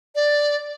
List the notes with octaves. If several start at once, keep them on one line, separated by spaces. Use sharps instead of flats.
D5